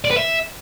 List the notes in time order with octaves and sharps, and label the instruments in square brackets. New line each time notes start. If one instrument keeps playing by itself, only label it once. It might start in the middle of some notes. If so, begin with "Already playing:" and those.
[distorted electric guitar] D5
B4
E5